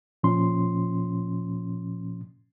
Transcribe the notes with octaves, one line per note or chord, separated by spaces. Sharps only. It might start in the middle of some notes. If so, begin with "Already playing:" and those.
A#2 F3 C#4 C6